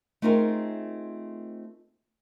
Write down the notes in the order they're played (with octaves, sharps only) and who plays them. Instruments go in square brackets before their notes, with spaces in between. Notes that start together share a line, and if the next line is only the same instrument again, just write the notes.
[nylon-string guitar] A3 C4 D#4 F4 G#4 A#4